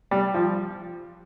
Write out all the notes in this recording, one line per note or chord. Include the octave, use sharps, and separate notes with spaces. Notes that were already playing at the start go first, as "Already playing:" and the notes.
G3
F3